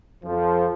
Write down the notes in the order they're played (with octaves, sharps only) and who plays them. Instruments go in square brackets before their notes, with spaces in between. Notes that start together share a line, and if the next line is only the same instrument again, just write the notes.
[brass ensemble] F2 F3